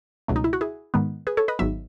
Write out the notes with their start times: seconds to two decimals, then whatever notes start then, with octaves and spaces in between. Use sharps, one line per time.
0.28 C#2 B2 F#3 A3
0.36 D#4
0.44 E4
0.53 F#4
0.61 E4 G#4
0.94 G#2 D#3 G#3 B3
1.27 G#4 B4
1.37 A4 C#5
1.48 B4 D#5
1.59 G#1 G#2 F#3 B3 E5